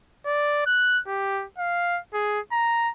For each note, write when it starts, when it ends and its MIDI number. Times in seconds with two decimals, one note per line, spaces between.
0.26 0.61 74
0.66 1.00 90
1.07 1.45 67
1.58 1.99 77
2.14 2.40 68
2.52 2.90 82